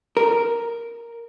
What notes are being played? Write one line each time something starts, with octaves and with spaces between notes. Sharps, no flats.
A#4